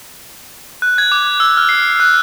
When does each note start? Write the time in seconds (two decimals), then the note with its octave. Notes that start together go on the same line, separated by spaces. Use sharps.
0.82 F#6
0.98 G#6
1.12 D6
1.40 E6
1.57 F6
1.69 C7
2.00 F#6